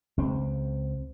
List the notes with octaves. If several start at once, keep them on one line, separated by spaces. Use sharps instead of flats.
C#2 C4